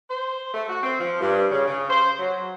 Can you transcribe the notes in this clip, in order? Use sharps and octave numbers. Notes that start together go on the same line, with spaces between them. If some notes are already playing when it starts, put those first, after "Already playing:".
C5
A3
F#4
C4
F3
G2
C#3
C#3
C5
F#3